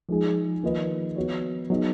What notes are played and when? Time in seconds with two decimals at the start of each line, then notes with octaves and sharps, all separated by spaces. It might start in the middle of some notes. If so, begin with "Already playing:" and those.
0.09 F3 G#3 D#4 G#4
0.63 D#3 A#3 F4 B4 D#5
1.16 B3 F#4 C#5
1.69 F#3 B3 D#4 G#4 D#5